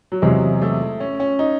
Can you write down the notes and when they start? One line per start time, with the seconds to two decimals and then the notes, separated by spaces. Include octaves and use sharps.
0.12 F#3
0.22 E2 C3 F#3 G#3
0.62 A3
1.00 C#4
1.20 C#4
1.39 D#4